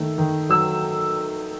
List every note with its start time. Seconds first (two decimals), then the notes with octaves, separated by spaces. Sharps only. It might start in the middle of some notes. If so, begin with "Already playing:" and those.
Already playing: D#3 A3
0.18 D#3
0.49 F#3 E6